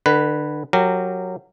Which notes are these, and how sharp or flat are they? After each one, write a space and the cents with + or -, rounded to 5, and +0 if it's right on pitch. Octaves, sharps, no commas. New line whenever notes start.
D3 +30 B4 +0
F#3 -10 G4 +0 A#4 -25